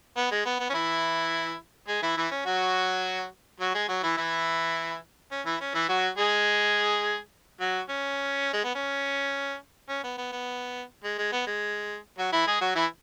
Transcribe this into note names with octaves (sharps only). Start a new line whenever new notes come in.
B3
G#3
B3
B3
C#4
E3 E4
G#3 G#4
E3 E4
E3 E4
C#4
F#3 F#4
F#3 F#4
G#3 G#4
F#3 F#4
E3 E4
E3 E4
C#4
E3 E4
C#4
E3 E4
F#3 F#4
G#3 G#4
F#3 F#4
C#4
G#3
B3
C#4
C#4
B3
B3
B3
G#3
G#3
B3
G#3
F#3 F#4
E3 E4
G#3 G#4
F#3 F#4
E3 E4